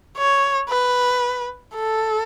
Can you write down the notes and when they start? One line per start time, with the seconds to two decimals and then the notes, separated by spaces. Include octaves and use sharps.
0.17 C#5
0.69 B4
1.76 A4